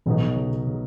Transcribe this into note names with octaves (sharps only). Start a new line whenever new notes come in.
B1 B2 E3 F#3 B3 D#4
C#3
C#3